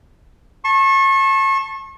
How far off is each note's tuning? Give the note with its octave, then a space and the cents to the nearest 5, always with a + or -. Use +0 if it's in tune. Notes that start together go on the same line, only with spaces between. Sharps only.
A5 +0 C#6 -35